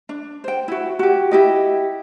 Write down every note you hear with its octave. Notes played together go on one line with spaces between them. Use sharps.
D4
C5 G5
E4 F#4
F#4 G4
E4 G4 D#5